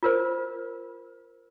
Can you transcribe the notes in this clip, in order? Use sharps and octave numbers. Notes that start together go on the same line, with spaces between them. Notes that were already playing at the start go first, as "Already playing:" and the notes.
F4 A#4 C5